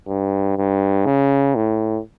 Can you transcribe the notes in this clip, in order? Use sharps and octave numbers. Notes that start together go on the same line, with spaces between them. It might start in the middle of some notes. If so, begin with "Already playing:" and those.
G2
G2
C#3
A2